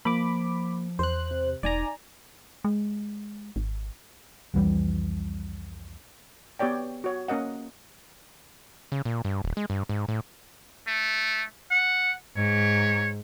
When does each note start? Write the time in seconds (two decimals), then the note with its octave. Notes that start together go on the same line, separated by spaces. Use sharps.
0.05 F3 A#3 B5 D6
0.99 E2 C5 F#6
1.31 C3
1.63 E1 D#4 D5 G#5 A#5
2.65 G#3
3.56 G#1
4.54 C2 F2 E3 G3
6.59 B3 G4 C#5 D5 G5
7.04 F#4 C#5
7.28 A#3 C#4 A#4 D#5 F#5
8.92 C#3
9.05 A#2
9.25 G2
9.44 D#1
9.57 G#3
9.70 G2
9.89 G#2
10.08 A2
10.87 A3
11.71 F#5
12.36 G#2 C#5